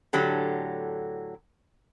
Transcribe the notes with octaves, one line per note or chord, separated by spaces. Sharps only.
A2 D3 F#3 G4 A4